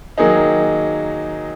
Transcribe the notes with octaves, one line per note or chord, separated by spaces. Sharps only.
D#3 F#3 A#3 D#4 G#4